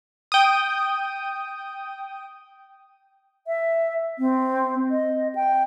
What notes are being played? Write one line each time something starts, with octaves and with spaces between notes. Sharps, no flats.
G5 D#6
E5
C4
D#5
G5